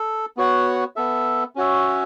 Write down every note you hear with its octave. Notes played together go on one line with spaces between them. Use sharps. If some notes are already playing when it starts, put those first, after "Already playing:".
Already playing: A4
B3 F#4 C#5 F#5
B3 A4 E5
C#4 F#4 C#5 E5